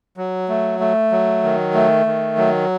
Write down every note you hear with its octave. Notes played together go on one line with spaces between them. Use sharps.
F#3
A3
A3
F#3
D#3
A3
D#3
F#3